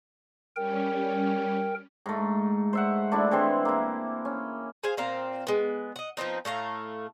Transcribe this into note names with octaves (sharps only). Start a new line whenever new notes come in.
G3 C#4 A#4 G5
G#2 A3
C5 E5 F#5
A3 D4 E4
E3 G#3 C4 C5
A#3 E4
C#4
G#4 C5 F5 G#5
A#2 C4 F5 A#5
G#3 B3
D#5 F#5
F3 B3 C4 D#4
A2 A3 F5 A#5